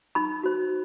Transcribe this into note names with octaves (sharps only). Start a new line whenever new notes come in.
D#4 B5
F#4 C5